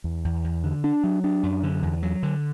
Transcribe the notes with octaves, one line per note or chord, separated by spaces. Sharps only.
E2
E2
E2
D3
D4
F#3
D4
F#2
D3
E2
F#3
D3